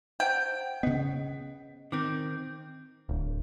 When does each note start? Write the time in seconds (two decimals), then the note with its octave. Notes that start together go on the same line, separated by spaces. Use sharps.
0.20 C5 F#5 G5
0.83 C#3 B3 D#5
1.92 D#3 C4 D6 G6
3.09 D1